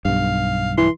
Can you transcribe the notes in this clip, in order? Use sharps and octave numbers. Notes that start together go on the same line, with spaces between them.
B1 G2 F5
E3 C6